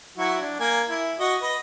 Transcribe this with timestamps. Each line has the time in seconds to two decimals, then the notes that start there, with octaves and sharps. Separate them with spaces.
0.18 F#3 E4 F#4
0.41 D4
0.60 A#3 G#5
0.89 E4
1.19 F#4 D#5
1.42 B4 D#5